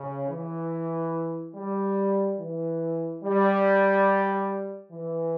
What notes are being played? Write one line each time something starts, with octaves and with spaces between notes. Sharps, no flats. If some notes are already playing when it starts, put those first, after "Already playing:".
Already playing: C#3
E3
G3
E3
G3
E3